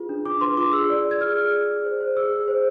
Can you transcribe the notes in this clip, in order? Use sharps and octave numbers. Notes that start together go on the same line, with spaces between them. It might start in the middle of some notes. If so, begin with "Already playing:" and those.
Already playing: F4 G#4 B4
D4
D4 D6
B4 C6
F4 D6
G#4 E6
D5
D5
G#6
G#4 F6
G#4
D5
G#4
C5
C5
G#4 E6
G#4
C5